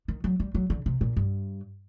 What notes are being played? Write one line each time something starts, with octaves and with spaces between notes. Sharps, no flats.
D#3
F#3
G3
F#3
D3
C3
A#2
G2